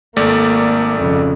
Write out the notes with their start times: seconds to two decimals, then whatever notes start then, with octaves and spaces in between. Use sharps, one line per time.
0.16 G#1 A3 A#3 D5
0.98 F2 C#3